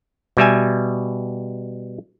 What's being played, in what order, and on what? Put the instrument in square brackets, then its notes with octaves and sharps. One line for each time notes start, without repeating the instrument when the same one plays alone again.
[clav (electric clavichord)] B2 G3 E5 G#5